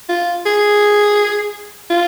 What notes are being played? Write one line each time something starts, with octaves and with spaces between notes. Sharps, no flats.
F4
G#4
F4